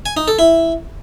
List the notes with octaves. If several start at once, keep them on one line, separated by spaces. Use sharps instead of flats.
G#5
D#4
A4
E4